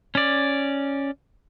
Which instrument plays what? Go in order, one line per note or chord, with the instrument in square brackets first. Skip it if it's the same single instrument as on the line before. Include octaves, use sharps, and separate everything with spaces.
[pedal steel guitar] C#4 D5